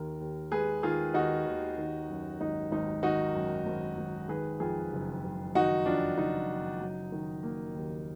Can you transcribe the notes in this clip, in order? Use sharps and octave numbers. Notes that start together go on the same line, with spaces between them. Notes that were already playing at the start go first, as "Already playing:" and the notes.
Already playing: D#2 D#3 A#4
D#2
G#3 G#4 B4
D#3 F4 G#4
D#2 D#4 F#4
D#2
D#3
F#2
G#1 D#4
G#1 D#4
D#3 D#4 F#4
F#2
G#1
G#1
D#3 G#4 B4
F2 F4 G#4
F#1
F#1
D#3 D#4 F#4
F2 D4 F4
F#1 D#4
F#1
F#3
D#3
A#3
D#2